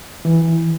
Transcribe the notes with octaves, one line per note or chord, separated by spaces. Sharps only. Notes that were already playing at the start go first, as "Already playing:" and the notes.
E3